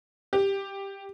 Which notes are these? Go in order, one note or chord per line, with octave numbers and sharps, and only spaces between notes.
G4